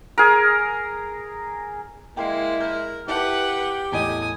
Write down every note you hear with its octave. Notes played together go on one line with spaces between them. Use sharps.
G#4 A#4
G#3 A#3 E4 G5 C6 C7
A#4 G6
E4 G4 B4 F#5 A5
E2 A2 D#5 G#5 D#6